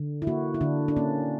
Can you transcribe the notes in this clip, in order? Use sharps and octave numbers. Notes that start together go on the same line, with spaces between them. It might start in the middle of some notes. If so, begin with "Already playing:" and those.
Already playing: D3
E4
A#3 F#4
E4
D3 D4
D4
A#3 C#4